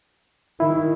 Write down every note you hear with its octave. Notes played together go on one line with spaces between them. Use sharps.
D#3 E4